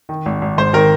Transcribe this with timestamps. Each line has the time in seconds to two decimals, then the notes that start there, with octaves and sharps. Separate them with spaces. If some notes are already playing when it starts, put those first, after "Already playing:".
0.09 D#3
0.26 G#1
0.42 G#1
0.58 G#2 C5
0.73 D#3 A#4